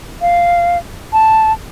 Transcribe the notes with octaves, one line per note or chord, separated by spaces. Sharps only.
F5
A5